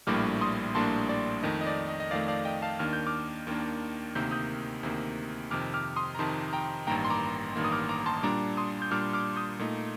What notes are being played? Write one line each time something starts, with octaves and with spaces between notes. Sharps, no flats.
A#1 A2 G3 A#3 D4 D6 F6
C6 D#6
A#1 A2 G3 A#3 D4 A5 C6
D5
F2 D#3 A3 D#5
D#5
D5
D#5
D#5
F2 D#3 A3 D5 F5
D5 F5
D#5 G5
F5 A5
D#2 D#3 A#3 D4 F6
G6
D6 F6
D#2 D#3 A#3 D4
D2 C3 D#3 A#3 G6
D#6 G6
D2 C3 D#3 A#3
F2 C3 D#3 D6 F6
D6 F6
C6 D#6
A#5
F2 C3 D#3 A5 C6
G5 A#5
A1 G2 D#3 A#3 G5 A#5
C6
A#5 D6
A1 G2 D#3 A#3
D#6
D6 F6
A#5 D6
A5 C6
A#2 G3 D4 A#5 D6
C6 D#6
G6
A#2 G3 D4 D6 F6
D6 F6
D#6 G6
A#2 A3 D#4